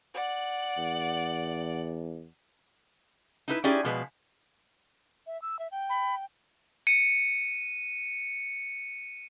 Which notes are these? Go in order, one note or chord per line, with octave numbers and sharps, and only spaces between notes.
D5 F#5
E2
D#4 E4 B4
C#4 D#4 E4 G4 G#4 D5
B2 F3 G#3 B4
E5
E6
E5
G5
B5
C#7 D#7